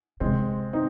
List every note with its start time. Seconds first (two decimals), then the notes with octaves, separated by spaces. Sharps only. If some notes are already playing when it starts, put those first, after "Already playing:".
0.20 C3 G#3 C4
0.73 C4 D#4